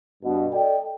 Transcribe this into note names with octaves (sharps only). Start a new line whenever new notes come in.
G2 B2
A4 D5 D#5 G5